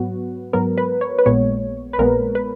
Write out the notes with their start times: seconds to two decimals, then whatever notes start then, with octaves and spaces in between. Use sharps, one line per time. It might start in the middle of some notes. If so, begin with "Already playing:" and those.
Already playing: G#2 F#3 B3 F#4
0.53 G#2 F#3 B3 A#4
0.78 B4
1.01 C#5
1.19 B4
1.26 A#1 A#2 G#3 B3 C#5
1.93 B4
1.98 A#1 A#2 G#3 B3 A#4
2.35 B4